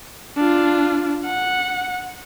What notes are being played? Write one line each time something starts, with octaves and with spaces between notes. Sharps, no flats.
D4 F4
F#5